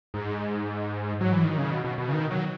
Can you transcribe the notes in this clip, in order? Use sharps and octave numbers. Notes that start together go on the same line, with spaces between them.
G#2
F#3
E3
D#3
C#3
B2
B2
B2
C#3
D#3
F#3